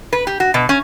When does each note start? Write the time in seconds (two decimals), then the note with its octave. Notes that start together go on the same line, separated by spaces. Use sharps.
0.13 B4
0.27 G4
0.40 F#4
0.54 B2
0.69 C#4